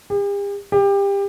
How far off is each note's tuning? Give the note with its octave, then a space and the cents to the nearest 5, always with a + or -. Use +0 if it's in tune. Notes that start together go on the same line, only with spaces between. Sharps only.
G4 +45
G4 +25